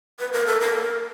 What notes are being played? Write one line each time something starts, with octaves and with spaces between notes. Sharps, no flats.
B4
A#4
A4
A#4